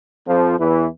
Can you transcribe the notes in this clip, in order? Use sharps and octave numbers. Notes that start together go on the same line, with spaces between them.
F2 F3
E2 E3